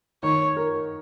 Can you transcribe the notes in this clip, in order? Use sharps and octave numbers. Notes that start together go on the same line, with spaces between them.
D#3 C#5
A#4